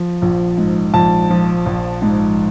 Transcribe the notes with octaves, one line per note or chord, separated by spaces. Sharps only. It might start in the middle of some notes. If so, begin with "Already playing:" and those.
Already playing: F3
A#1
G#2
A#1 A5
F3
A#1
G#2